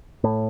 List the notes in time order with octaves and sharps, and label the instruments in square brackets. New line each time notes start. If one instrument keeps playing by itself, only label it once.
[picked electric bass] A2